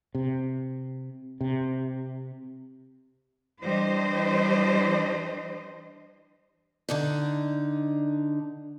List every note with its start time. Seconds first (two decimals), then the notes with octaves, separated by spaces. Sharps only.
0.15 C3
1.41 C3
3.62 E3 G3 D4 C5 D#5
6.89 D3 D4 D#4